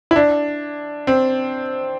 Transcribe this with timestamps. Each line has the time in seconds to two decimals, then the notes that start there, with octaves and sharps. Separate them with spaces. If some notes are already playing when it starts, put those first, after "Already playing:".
0.11 E4
0.16 D4
1.07 C4